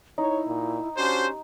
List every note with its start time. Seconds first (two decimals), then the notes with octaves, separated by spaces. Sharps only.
0.18 D#4 E4 C#5
0.47 A#2
0.97 C#4 D4 F#4 G4 C5